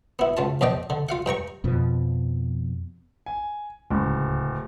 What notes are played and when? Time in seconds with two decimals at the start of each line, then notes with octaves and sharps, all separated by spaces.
0.19 B3 E4
0.37 C#2 F4 A5
0.61 A#1 E2 D5 D#5 G5
0.90 D3
1.09 F4 F5 F#5
1.26 G2 G5 A#5 C#6
1.64 F2 B2 F3
3.26 G#5
3.91 D1 C#2